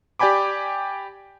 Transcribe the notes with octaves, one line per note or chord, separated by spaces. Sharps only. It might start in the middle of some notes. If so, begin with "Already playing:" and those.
G4 D5 G5 G#5 B5 D6